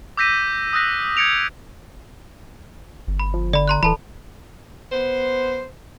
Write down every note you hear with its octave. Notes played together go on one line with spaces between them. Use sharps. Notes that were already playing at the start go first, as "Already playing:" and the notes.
D6 E6 G6 A#6 B6 D#7
D#6 E6 F#6 A#6 B6
G6 G#6 A#6 C#7 D7 F7
G1
B5
F3
D3 D5 B5
A#5 C6 F#6
D1 E3 A4 A5 B5
B3 C5